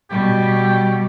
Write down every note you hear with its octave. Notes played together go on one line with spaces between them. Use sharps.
B2 G3 G4